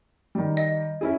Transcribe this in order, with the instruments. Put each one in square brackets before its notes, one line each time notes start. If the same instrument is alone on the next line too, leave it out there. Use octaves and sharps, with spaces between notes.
[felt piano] D#3 G3
[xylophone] D#5
[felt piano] C#4 E4 G#4